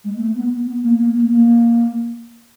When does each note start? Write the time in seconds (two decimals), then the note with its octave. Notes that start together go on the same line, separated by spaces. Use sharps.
0.04 G#3
0.16 A#3
0.20 A3
0.35 B3
0.52 B3
0.67 B3
0.83 A#3
0.99 A#3
1.15 A#3
1.29 A#3